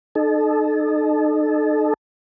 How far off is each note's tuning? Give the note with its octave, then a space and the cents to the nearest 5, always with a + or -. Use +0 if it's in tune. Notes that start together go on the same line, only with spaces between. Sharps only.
D#4 -35 A4 -25